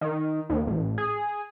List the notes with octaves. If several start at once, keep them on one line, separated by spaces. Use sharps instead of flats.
D#3
D#2
A1
G#4